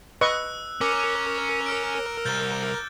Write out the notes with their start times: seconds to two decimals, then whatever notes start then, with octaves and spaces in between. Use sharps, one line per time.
0.21 B4 D#5 C#6 E6 F#6
0.81 C#4 A#4 D6 F6 C#7
1.66 D6 F6 D7
2.25 C2 G6 A6 G7